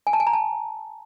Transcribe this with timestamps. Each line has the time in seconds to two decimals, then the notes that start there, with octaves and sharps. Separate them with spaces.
0.07 G#5
0.13 A5
0.20 G#5
0.27 A#5
0.33 A5